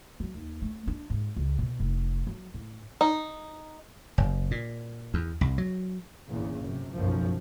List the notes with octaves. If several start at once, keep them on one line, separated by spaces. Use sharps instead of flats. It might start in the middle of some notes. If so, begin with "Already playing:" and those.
F#3
D#2
A3
D4
G#2
C#2
B2
F1
F#3
A2
D#4
F#1
A#2
E2
C2
F#3
G1 E2 A#2 C#3
F#2 C3
F#1 B1 F#2 F3